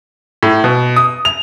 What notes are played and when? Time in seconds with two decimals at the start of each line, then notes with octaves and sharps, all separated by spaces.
0.43 A2
0.64 B2
0.96 D#6
1.25 F7